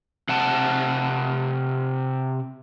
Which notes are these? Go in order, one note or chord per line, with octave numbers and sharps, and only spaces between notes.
C3 F#5 A5